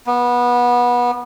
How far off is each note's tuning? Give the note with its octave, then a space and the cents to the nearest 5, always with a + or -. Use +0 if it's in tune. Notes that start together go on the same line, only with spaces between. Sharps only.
B3 -20